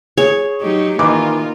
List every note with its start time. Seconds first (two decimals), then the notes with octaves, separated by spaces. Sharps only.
0.17 G#4 C#5
0.62 F#3 D#4 G4
0.99 D#3 E3 A#3 D#4 F4 D6